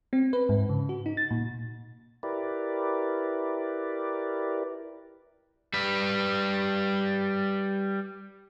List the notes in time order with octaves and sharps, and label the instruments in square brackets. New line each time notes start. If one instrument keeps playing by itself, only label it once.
[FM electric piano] C4
B4
G#2
C#3
F#4
D#4
A6
A#2
[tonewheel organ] E4 G4 A#4 B4 D5
[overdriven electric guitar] G3 B4